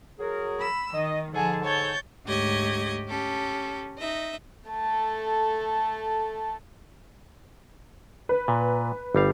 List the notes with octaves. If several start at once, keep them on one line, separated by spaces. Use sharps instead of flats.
F#3 G#4 A#4
B5 E6
D#3 D#5
G#2 D3 F3 G#4 F#5 A5
C#5 G6 A6
D2 G#2 G4 C#5 D#5 G#6
C#4 G4 A4
D#4 D#5 E5
A3 A4
B4
A#2
G1 G3 F5